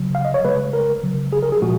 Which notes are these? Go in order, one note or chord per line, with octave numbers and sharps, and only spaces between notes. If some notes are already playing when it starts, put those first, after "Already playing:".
Already playing: C#3 F#3
F5
D#5
C#5
C#3 G#3 B4
A#4
C#3 F#3
G#4
A#4
G#4
A#2 F3 G#3 F#4